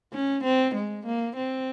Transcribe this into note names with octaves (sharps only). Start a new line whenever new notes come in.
C#4
C4
G#3
A#3
C4